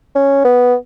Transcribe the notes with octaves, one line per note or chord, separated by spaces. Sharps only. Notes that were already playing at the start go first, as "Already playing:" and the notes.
C#4
B3